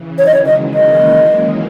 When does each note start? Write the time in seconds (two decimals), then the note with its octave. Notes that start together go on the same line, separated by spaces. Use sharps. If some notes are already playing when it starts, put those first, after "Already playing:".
Already playing: C#3 E3
0.18 D#3 F#3 C#5
0.26 D#5
0.34 C#5
0.46 E3 G#3 D#5
0.74 F#3 A#3 D#5